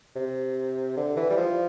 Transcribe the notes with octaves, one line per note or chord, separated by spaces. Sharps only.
C3
D3
E3
G3
F3